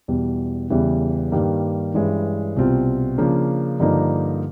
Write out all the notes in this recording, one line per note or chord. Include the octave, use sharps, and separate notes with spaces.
E2 B2 G3
E2 C#3 E3 G3
G2 D#3 G3 A#3
G2 E3 G#3 C#4
C2 B2 G3 C4 F4
C#3 F3 A#3 D4
G2 D3 F3 A#3 D#4